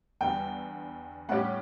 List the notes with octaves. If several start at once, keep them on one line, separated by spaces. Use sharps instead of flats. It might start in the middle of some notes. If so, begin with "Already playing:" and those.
E2 D3 G3 G5
A2 G3 C#4 G4 F#5